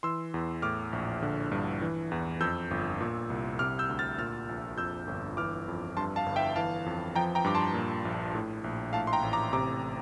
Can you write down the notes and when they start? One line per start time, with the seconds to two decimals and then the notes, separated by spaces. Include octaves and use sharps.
0.03 E3 C6 E6
0.34 E2
0.62 A2 D6 F6
0.93 A#1
1.22 D3
1.52 G2
1.82 E3
2.12 E2
2.40 F2 E6 G6
2.71 G1
3.00 A#2
3.30 C2
3.59 C3 D6 F6
3.79 E6 G6
3.89 D2
3.99 F6 A6
4.18 A#2 F6 A6
4.49 A#1
4.78 F2 E6 G6
5.07 G1
5.37 E3 D6 F6
5.68 F2
5.97 G2 A5 C6
6.16 F5 A5
6.26 G1
6.36 E5 G5
6.56 E3 F5 A5
6.86 F2
7.16 F3 G5 A#5
7.35 G5 A#5
7.44 G2 D6
7.55 A5 C6
7.74 A#2
8.05 A#1
8.35 A2
8.64 A#1
8.93 A2 F5 A5
9.07 C6
9.13 G5 A#5
9.22 A1
9.33 A#5 D6
9.53 C3 A#5 D6